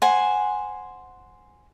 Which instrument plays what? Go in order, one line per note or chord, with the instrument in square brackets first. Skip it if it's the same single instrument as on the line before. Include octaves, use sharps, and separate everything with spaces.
[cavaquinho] C5 F#5 G#5